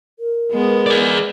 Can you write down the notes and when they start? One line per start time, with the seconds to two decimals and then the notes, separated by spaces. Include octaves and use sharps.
0.19 A#4
0.51 G#3 B3
0.86 G#4 D5